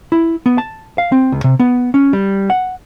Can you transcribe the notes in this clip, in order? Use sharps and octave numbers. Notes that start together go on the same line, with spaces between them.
E4
B3
A5
F5
C4
C#2
C3
B3
C#4
G3
F#5